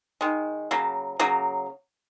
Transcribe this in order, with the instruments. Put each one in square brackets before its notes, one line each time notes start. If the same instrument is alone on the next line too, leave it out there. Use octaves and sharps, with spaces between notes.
[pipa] D#3 G#3
C#3 F#3 A#3
C#3 F#3 A#3